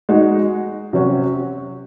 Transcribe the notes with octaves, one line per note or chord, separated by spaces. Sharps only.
G#3 D#4 F#4
C3 F#3 C#4 F#4